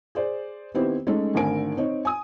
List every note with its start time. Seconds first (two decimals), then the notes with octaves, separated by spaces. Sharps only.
0.15 G#4 C5 D5
0.74 D#3 B3 C4 E4 G4 C5
1.07 G#3 A3 C#4 D#4 A4
1.35 G#1 D3 A3 A#4 G#5 D7
1.77 C4 D#4 C#5
2.05 G#5 D#6